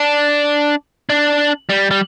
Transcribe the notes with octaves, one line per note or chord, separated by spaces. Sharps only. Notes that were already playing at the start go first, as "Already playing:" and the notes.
Already playing: D4
D4
G3
G3